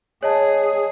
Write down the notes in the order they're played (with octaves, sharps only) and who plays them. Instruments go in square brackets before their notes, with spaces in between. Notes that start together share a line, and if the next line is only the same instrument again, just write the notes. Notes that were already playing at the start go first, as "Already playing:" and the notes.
[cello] G#4 [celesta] C#5 D#5 A5